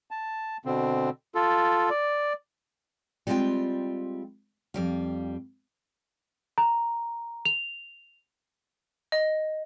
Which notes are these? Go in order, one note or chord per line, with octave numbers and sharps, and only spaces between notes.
A5
B2 D3 C4
F4 A4
D5
G3 G#3 C4 C#4 F4 G5
F2 G3 F5
A#5
F7
D#5